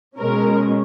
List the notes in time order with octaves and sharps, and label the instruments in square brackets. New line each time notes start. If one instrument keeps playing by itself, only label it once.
[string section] B2 G#3 C#4 A#4